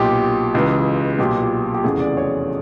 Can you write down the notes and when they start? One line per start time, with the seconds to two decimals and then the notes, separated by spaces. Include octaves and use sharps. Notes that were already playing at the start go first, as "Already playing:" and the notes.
Already playing: B1 A#2 G4
0.54 C#2 C#3 E3
1.19 B1 A#2 G4
1.74 G4
1.84 F1 E2 C#3 E3 G#4
2.00 D5
2.17 C#5